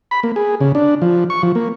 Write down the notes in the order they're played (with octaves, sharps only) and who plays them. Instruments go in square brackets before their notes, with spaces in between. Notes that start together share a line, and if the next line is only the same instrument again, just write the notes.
[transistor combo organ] B5
A#3
G#4
C#3
D4
F3
C#6
F3
A#3